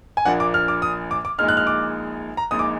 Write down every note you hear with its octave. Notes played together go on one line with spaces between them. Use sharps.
G#5
A#1 A#2 F3 A#3 D4 F#5
D6
F6
D6
D#6
D6
D6
A#1 A#2 G#3 D#4 F6
F#6
F6
D6
A#5
A#1 A#2 G#3 D#4 D#6
D6